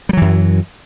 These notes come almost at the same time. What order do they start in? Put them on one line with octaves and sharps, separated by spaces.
G3 F#3 E3 F#2